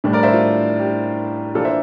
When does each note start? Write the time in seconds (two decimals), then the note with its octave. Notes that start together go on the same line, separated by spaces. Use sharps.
0.04 A2 G3 D4
0.13 A#4 D5
0.23 C5 E5
0.33 F4
0.79 G4
1.55 E3 A#3 D4 F4 A4
1.65 C5 E5